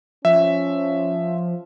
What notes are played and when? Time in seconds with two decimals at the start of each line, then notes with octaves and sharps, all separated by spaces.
0.25 F3 C#4 E5